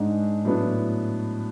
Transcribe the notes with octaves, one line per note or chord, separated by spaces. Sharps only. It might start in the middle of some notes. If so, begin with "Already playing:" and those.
Already playing: G#2 G#3 D4
A2 F#3 B3 D4